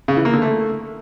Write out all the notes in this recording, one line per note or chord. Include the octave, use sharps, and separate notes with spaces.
C#3
E3
A#3
D3
A3